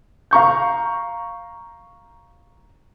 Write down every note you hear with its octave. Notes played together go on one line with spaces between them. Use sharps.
F5 A#5 C#6 G6